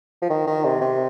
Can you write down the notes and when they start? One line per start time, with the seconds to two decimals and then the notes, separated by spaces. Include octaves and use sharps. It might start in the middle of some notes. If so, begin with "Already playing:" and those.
0.22 F3
0.30 D#3
0.47 D#3
0.64 C3
0.81 C3